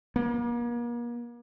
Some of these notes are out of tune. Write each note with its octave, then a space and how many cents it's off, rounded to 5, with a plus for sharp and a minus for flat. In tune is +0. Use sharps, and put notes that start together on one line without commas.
A#3 +40